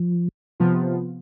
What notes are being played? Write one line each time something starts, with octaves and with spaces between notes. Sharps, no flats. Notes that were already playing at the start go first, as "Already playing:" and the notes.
Already playing: F3
C3 F3 B3 F4